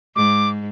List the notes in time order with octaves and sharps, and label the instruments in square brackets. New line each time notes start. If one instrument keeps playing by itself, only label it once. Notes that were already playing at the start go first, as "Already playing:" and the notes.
[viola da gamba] G#2 [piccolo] D6